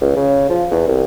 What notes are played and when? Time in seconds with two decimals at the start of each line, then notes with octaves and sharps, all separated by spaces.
0.01 C#2
0.16 C#3
0.49 F3
0.71 E2
0.88 C2